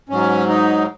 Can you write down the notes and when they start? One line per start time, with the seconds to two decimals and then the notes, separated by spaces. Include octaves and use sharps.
0.09 G#2 F#3 C#4
0.49 D#4